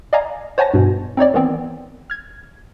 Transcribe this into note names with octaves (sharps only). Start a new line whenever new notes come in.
D5 D#5 F5 G#5 A#5
C5 C#5 F#5 G#5 A5 A#6
G2 B2
C4 D#4 C#5 D5
D#3 E3 B3 C4
F6 G#6